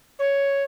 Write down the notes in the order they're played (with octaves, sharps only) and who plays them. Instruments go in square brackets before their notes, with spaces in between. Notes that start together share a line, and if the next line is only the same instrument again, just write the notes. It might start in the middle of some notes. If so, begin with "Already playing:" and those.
[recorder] C#5